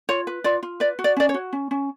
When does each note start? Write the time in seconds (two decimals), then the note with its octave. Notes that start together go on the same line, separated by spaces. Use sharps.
0.09 F4 C#5
0.27 B4
0.44 F4 D5
0.63 F4
0.80 B4 D5
0.99 F#4
1.04 D5
1.17 C#4 D5
1.29 C#5
1.34 F#4
1.53 C#4
1.71 C#4